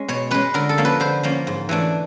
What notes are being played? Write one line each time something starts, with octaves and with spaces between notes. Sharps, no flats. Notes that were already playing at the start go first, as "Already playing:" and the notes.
Already playing: G#3 C#4
B2 C#5
G#3 C#4 B4
D3 A#4
A4
F3 A#3 C#4
B4
D3 C5
F3 A#3 C#4
G#2
E3 A3 D4